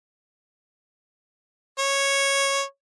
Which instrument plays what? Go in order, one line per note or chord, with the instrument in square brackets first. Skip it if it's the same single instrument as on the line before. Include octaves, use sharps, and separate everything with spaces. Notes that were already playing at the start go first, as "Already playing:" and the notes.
[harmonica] C#5